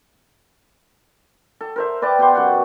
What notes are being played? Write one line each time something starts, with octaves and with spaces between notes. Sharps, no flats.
A4
A#4 C5 E5
B4 D5 G5 A5
B3 G4 F#5 C6
F#2 B2 G4 F#5